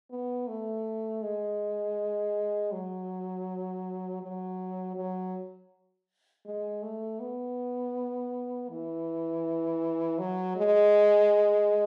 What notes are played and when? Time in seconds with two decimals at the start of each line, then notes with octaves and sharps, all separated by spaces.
0.10 B3
0.48 A3
1.22 G#3
2.72 F#3
4.22 F#3
4.96 F#3
6.45 G#3
6.83 A3
7.20 B3
8.69 E3
10.18 F#3
10.56 G#3